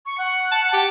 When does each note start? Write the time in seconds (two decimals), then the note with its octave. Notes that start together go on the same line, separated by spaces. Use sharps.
0.06 C#6
0.18 F#5
0.52 A5
0.74 G4